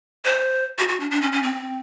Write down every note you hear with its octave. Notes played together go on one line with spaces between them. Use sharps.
C5
F#4
F#4
D4
D4
C#4
C#4
C4